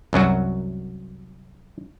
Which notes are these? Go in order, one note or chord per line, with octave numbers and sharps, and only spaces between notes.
C2 F#2 F#3 F#4